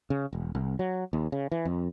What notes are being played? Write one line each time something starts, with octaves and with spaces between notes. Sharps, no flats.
C#3
E1
C2
F#3
D#2
C#3
E3
F2